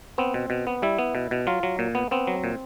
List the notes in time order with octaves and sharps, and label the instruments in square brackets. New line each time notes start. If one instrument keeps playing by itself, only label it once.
[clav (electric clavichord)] B3 C4
B2
B2
B3
G3 E4
B3
B2
B2
F#3 F4
F#3
A#2
B3
B3 C4
F#3
A#2